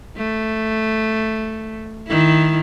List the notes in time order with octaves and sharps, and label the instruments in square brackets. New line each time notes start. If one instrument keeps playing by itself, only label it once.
[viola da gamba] A3
D#3 E4